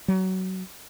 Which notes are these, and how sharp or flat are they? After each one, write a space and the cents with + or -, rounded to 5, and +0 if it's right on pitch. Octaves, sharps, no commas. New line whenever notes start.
F#3 +20